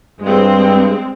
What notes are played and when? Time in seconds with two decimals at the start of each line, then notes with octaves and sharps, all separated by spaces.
0.20 G2 G#3 C4